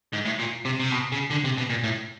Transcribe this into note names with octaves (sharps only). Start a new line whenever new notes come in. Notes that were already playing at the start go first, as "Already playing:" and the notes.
G#2
A2
A#2
C3
C3
B2
C#3
D3
C3
B2
A#2
A2